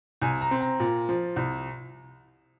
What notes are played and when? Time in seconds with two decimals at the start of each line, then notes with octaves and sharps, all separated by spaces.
0.22 C2 G#5
0.41 A#5
0.51 C4
0.61 A#5
0.80 A#2
1.09 F3
1.36 C2